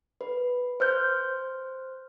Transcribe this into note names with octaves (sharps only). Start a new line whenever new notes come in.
B4
C5 F6 G6